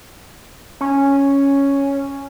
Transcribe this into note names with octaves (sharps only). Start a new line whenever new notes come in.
C#4